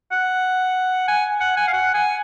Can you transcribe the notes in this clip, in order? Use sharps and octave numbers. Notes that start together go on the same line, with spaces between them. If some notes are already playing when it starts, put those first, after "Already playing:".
F#5
G#5
F#5
G#5
F5
F#5
G#5